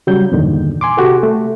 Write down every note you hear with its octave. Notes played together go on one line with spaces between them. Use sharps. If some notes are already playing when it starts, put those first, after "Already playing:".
C#3 F#3 G3 G6
E2 G2 A#2 D3 D#3
G#5 C6 D6
C3 F#4 G4 A4
A3